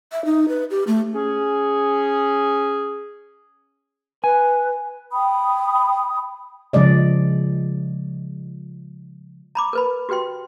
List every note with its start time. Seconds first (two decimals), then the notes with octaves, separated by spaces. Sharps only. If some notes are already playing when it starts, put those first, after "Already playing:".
0.12 E5
0.25 D#4
0.49 B4
0.71 G4
0.87 A3
1.14 C#4 G#4
4.24 B4 G#5
5.12 G5 B5 D#6
6.73 C#3 F3 G#3 D5 D#5
9.55 A#5 B5 D6
9.73 A#4 B4 B5
10.09 F#4 G4 B4 G5 C6